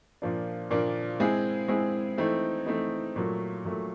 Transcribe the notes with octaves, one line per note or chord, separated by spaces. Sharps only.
A#2 F3 A#3 D4
A#2 F3 A#3 D4
G#3 C4 E4 G#4
G#3 C4 E4 G#4
E3 A3 C4 D#4
E3 A3 C4 D#4
A#2 F#3 A3
A#2 F#3 A3